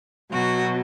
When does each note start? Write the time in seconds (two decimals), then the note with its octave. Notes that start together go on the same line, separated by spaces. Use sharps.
0.31 B2 F#3 F#4